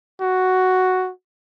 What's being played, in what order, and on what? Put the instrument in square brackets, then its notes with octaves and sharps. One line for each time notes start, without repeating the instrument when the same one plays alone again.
[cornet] F#4